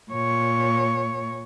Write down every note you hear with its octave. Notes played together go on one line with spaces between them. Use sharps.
A#2 C#5